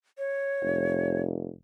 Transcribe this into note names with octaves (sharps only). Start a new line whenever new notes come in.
C#5
F1